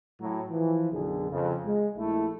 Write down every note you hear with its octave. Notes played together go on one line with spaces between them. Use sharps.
A2 F#3
E3 F3
B1 F#2 D3 G#4
F2 C#3
G#3
A#1 A3 E4